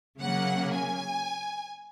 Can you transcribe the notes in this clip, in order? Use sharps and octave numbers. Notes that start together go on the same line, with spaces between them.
C#3 F#3 A#3 F#5
G#5